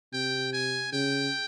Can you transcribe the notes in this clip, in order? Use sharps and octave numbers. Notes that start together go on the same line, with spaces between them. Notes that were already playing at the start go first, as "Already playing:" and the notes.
C3 G5
G#5
C#3 G5